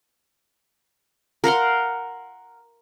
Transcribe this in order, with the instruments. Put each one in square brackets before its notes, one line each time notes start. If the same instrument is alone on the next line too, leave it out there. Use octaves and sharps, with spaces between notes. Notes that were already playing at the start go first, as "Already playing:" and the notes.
[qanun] A#4 F5 F#5 C6